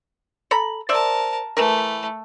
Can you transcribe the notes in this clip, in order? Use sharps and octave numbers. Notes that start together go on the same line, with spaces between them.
A4 A#5 B5
A#4 C5 D5 E5 A5
E3 A3 A#4